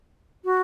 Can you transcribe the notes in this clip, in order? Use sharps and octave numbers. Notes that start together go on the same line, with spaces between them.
F#4